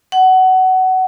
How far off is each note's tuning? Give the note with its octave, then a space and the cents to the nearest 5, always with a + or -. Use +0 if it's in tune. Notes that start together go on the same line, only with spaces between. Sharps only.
F#5 +20